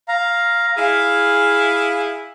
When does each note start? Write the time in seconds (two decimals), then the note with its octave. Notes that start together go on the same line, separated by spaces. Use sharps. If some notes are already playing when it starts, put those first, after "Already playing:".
0.08 F5 A#5
0.77 E4 G#4 F5